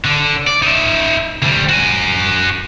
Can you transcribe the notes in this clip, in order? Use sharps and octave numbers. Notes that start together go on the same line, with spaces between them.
D3
D5
D#4 E5
D2 G3
F#4 G#5